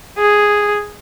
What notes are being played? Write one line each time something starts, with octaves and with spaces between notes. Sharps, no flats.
G#4